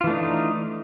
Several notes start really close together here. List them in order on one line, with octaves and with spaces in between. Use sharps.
F4 E3 A3 D4 D#4